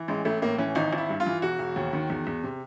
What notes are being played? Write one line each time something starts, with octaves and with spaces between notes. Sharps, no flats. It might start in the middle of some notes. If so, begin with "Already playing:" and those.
Already playing: E3
A1 G#3
A1 A3
A2 A#3
E3 C#4
G#1 D#4
G#1
E4
G2
F4
E3
E1 F#4
E1
D#2
D#3
E2
E2
C3